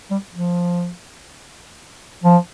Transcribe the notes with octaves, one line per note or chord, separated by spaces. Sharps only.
G3
F3
F3